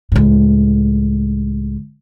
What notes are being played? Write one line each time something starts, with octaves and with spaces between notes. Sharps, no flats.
C#2 A2